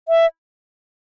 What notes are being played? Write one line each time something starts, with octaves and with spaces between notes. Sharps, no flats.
E5